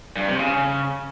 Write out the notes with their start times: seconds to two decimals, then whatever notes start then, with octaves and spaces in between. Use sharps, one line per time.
0.16 G2
0.28 C3
0.40 C#3